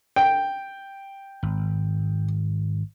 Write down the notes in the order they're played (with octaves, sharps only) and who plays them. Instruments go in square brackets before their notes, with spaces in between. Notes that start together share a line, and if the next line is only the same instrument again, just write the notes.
[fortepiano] G5
[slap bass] G#1